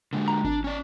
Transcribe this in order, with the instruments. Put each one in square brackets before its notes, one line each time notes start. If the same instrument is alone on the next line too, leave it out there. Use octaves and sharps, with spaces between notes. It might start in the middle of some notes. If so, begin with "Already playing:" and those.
[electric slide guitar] D3 G#3
[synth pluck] A#5
[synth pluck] G#1 [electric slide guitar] D4
[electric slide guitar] C#4 D5